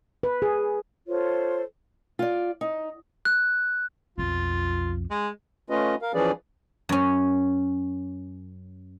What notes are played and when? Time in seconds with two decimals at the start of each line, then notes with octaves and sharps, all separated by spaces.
0.23 B4
0.42 G#4
1.07 F4 A4 C5 C#5
2.19 F4 D5
2.61 D#4
3.25 F#6
4.18 B1 F2 F4
5.11 G#3
5.70 A3 C#4 F4 B4 D#5
6.02 A#4 F5
6.14 E3 F3 C#4 G#4 B4 D5
6.89 F#2 C#4